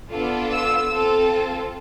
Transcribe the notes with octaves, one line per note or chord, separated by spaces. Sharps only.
B3 D4 F4 A4
E6
C4 F4 A4